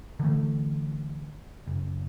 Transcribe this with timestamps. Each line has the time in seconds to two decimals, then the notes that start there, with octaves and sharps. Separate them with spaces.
0.20 D3 E3 G3 A3
1.67 F#1